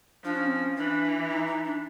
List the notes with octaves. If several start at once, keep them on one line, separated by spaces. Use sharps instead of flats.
F3 D4
C#4
C4
C#4
E3 D4
D#4
D#4
D4